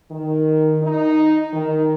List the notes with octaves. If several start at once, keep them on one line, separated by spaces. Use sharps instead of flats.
D#3
D#4
D#3